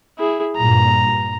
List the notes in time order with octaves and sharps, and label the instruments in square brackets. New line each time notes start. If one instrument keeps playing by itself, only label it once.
[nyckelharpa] E4 G#4
[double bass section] G2 A#2 [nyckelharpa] A#5